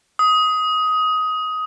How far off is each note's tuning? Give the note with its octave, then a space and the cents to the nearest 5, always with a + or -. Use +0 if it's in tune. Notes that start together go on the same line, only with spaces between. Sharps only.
D#6 +15